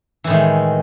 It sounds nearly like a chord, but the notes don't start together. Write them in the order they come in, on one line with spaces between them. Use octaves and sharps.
E3 A2 D#3 G#3